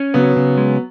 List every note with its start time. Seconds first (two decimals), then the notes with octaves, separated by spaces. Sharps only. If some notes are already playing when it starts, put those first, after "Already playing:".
Already playing: C#4
0.14 C#3 F#3 B3
0.36 C#3
0.58 G#3